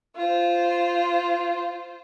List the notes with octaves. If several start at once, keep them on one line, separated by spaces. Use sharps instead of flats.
F4 C5